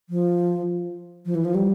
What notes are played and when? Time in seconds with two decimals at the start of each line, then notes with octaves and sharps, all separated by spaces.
0.10 F3
1.26 F3
1.35 E3
1.45 F3
1.55 G3